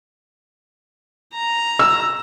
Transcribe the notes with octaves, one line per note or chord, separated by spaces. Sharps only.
A#5
E6